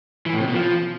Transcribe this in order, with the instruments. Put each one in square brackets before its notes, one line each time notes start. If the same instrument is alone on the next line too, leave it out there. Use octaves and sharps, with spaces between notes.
[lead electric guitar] E3
A2
C3
B2
F3